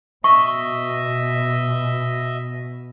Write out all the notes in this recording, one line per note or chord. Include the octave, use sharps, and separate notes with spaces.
B2 D#5 E5 C#6